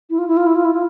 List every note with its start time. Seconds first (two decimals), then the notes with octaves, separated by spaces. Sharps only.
0.10 E4
0.18 F4
0.28 E4
0.37 F4
0.46 E4
0.55 F4
0.65 E4
0.74 F4